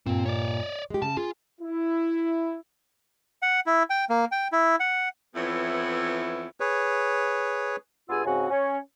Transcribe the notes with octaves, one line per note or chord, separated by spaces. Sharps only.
G2 A#2 C4
C#5 D5
G#3 G4
C#3 A5
F4 G#4
E4
F#5
E4
G5
A#3
G5
E4
F#5
F2 E3 B3 E4 C#5
G#4 B4 C#5
G2 B3 F4 G#4 G#5 E6
G#2 C#3 C4 F#4 F#5 G#5
C#4 C#5